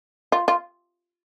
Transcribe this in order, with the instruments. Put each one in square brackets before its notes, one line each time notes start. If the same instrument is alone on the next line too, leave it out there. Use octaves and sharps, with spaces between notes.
[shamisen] F4
F4